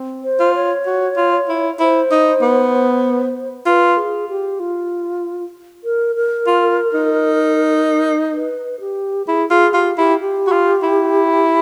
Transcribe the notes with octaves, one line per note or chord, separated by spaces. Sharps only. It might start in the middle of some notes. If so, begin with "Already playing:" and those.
Already playing: C4
C5
F4
C#5
F#4
F4
E4
E4 C5
D#4
B3
F4 B4
G#4
G4
F4
A#4
A#4
F4
D#4
B4
G4
E4 G#4
F4 G#4
F4 G4
E4 G4
G4
F#4
F4
E4